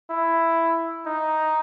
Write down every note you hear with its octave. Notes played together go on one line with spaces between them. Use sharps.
E4
D#4